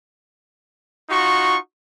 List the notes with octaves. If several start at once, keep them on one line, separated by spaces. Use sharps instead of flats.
D#4 F4 F#4 C#6